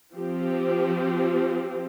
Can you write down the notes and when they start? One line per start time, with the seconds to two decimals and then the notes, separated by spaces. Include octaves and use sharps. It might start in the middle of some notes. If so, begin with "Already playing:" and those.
0.15 F3 C4 G4